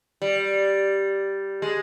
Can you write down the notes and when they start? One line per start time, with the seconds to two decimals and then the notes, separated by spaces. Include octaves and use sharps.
0.22 G3
1.62 G#3